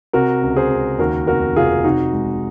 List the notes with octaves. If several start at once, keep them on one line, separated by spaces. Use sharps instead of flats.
C3 F#4 A#4
C#2
G#4 C5
C#2
D#2 F#4 A#4
F1 F#4 A#4
F1 F4 G#4
C3 D#4 F#4
G#3